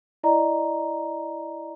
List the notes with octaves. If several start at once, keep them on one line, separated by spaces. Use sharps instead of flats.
E4 D5 D#5 A#5